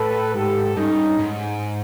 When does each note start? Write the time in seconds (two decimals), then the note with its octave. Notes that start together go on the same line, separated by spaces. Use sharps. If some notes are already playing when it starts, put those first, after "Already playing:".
Already playing: A2 A4 B4
0.34 G#2 G4 A4
0.76 G2 C#4 D#4
1.19 G#2